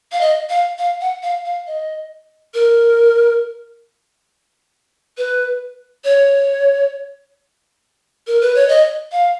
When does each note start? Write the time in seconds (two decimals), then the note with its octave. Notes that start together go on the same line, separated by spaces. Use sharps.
0.12 F5
0.21 D#5
0.49 F5
0.78 F5
1.01 F#5
1.23 F5
1.45 F5
1.67 D#5
2.54 A#4
5.18 B4
6.04 C#5
8.27 A#4
8.41 B4
8.55 C#5
8.69 D#5
9.12 F5